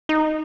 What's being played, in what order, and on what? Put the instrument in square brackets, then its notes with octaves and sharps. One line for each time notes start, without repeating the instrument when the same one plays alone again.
[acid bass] D#4